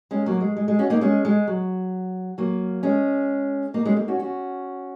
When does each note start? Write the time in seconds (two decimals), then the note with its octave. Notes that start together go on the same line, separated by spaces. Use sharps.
0.11 G#3 C#4
0.26 F#3 A#3
0.41 G#3
0.57 G#3
0.68 G#3
0.79 C#4 F#4
0.90 A#3 D#4
1.01 G#3 C#4
1.25 G#3
1.47 F#3
2.38 F#3 A#3
2.83 G#3 C#4
3.74 A#3 D#4
3.85 G#3 C#4
3.97 A#3 D#4
4.08 C#4 F#4
4.19 C#4 F#4